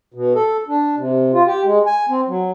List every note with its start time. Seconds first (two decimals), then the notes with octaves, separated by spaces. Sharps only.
0.14 B2
0.35 A4
0.68 D4
0.98 C3
1.33 F4
1.46 G4
1.65 G#3
1.86 G#5
2.09 C4
2.28 F#3